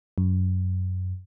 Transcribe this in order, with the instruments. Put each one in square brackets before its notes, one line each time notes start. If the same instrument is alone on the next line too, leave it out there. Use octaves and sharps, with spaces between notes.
[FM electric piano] F#2